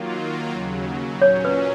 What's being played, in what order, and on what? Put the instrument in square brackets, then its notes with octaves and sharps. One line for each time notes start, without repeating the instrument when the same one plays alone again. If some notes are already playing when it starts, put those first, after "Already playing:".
Already playing: [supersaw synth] D#3 F#3 A#3 F4
D#2 C#3 F#3
[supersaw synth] A#2 F#3 C#4 [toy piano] C#5
[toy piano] B4